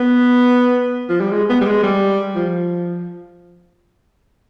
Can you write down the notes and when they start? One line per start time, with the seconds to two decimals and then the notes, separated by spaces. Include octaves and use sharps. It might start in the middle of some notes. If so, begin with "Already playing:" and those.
Already playing: B3
1.09 F3
1.21 G3
1.32 G#3
1.50 B3
1.61 G3
1.66 G#3
1.83 G3
2.35 F3